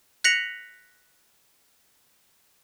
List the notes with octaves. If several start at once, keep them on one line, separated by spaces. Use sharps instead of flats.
F#6 A#6 B6 C#7 F7 F#7